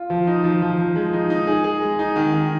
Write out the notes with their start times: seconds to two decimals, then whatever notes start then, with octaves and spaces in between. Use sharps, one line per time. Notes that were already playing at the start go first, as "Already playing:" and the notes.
Already playing: F4
0.10 F3
0.27 D#4
0.44 F3
0.62 F3
0.78 F3
0.96 G#3
1.13 D#4
1.30 D#4
1.47 G#4
1.64 G#4
1.82 G#3
1.99 D#4
2.16 D#3
2.33 D#3